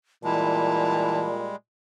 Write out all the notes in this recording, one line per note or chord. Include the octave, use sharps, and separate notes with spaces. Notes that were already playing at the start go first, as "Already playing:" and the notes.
A#2 E3 G3 G#3 A5